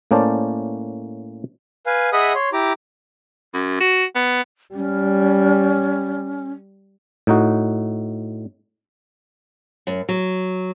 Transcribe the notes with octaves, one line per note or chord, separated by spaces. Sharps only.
A2 A#3 C#4 C5 D5 A5
B4 F5 G#5
G#4 D#5 E5 F#5 B5 D#6
C#5 C6
E4 G4 A#5 D6
F#2
F#4
B3
G3 C#4
A2 D#4 F#4
F#2
F#3